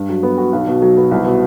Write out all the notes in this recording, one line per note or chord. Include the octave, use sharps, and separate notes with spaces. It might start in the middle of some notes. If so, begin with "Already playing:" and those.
Already playing: G2
F#3
B3
F#4
B1
B2
F#3
B3
C2
B2